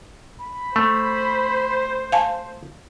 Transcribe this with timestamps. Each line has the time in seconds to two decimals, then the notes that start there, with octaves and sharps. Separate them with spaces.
0.41 B5
0.76 A3 C5
2.12 F5 G#5 A5